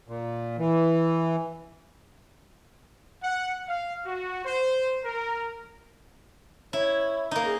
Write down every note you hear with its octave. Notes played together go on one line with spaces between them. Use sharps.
A#2
E3
F#5
F5
F#4
C5
A#4
E4 C#5
A#3 D#4
G#4